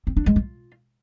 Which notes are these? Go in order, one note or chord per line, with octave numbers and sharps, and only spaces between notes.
C4
D4
G#3
F4